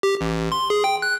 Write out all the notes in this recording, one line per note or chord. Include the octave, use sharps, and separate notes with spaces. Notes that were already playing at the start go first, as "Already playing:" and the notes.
G4
A1
C6
G#4
G5
F#6